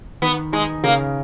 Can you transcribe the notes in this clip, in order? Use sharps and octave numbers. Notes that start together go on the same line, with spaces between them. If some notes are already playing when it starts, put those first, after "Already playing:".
D#3 B3
G#3 D#4
C#3 A#3